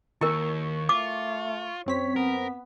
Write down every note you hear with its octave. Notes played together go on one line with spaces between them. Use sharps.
D#2 E4 A#4 C#6
A3 F4 D6
F#2 C4 C#5 B6
B3 A#4